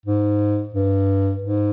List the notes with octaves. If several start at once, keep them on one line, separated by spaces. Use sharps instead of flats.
G#2
G2
G#2